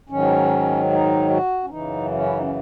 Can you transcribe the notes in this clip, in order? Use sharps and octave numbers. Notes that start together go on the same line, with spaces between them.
G#2 D#3 F#3 C#4
D#4
F#4
C#4
F#2 C#3 E3 D#4
C#4
E4
D#4
C#4